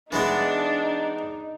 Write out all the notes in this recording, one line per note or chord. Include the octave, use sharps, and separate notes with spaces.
E3 G#3 B3 D4 D#4